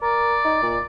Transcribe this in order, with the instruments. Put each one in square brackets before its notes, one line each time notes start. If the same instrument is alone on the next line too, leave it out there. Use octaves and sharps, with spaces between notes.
[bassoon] A#4 [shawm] D5
[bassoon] D#4
A#2